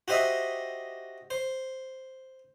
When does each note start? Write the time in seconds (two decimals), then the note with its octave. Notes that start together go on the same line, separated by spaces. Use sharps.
0.08 F#4 G4 C5 D#5 E5
1.30 C5